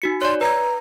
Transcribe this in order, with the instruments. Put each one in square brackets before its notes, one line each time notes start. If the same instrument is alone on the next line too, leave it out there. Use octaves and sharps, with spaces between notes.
[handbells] D#4 F#4 C#7
[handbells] C#5 D5 [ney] C6
[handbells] B4 G#6 [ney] A#5